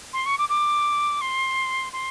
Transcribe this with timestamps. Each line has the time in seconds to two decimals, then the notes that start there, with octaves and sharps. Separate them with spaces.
0.13 C6
0.26 C#6
0.38 D6
0.49 D6
1.21 C6
1.93 C6